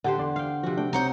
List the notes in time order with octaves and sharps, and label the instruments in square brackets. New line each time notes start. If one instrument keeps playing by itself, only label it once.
[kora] D3 G4 C5 [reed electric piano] A4 [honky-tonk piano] F#5
[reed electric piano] E2 D5 C6
[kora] F5 G5
[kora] C3 F#4 [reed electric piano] F3
[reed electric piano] A3 D4 [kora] G5
[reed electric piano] C2 C4 C#5 [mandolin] D#4 F#5 G6